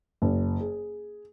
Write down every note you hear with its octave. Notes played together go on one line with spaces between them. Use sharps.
F#1
G#4